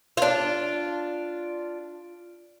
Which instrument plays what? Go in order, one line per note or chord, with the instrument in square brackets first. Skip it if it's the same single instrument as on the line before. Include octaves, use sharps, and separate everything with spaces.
[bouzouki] D4 F4